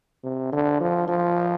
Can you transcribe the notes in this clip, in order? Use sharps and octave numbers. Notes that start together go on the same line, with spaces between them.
C3
D3
F3
F3